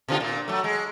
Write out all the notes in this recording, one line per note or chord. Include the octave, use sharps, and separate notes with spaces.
B2 D3 F4
A#2
F#3 A3
G#3